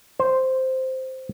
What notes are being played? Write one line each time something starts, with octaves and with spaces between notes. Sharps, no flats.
C5